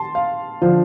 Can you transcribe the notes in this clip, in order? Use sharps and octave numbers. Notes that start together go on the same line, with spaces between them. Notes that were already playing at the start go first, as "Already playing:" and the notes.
Already playing: A5 C6
F5
D3 F3 D4 F4 C5